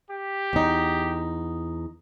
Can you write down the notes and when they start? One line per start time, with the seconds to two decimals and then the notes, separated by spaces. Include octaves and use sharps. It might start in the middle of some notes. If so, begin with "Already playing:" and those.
0.11 G4
0.53 E2 D#4